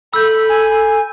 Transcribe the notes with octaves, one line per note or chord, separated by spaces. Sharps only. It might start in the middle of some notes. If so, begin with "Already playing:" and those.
A4 B5 E6 G6
G#5